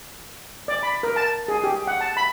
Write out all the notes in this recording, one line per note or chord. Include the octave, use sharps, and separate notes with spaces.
D5
B5
A#4
A5
G#4
G4
F#5
A5
B5